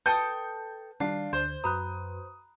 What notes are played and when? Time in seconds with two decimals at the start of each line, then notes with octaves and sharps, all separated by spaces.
0.06 A4 B4 G5 A5 D#6 G6
1.00 D#3 G3 D4 F4
1.33 D2 D3 C5 G#6
1.64 F#2 F#4 B4 A#5 B5 D#6 F#6